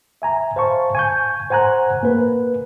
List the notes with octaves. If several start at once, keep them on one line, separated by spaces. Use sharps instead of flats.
E5 G#5 A#5
C5 F5 A5 C#6
G#5 C#6 G6
C5 F#5 G#5 A#5 F#6
A#3 B4